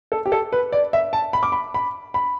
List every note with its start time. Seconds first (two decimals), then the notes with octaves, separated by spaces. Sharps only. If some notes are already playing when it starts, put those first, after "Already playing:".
0.12 A4
0.26 G4
0.32 A4
0.53 B4
0.72 D5
0.93 E5
1.13 A5
1.33 B5
1.43 D6
1.52 B5
1.74 B5
2.14 B5